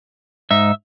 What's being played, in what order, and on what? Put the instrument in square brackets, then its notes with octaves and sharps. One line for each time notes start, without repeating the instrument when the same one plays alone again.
[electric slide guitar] G#2 D#4 [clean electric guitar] E5